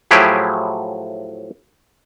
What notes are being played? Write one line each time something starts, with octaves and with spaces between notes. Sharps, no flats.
A2 F3 F#3 E4 G4 G#4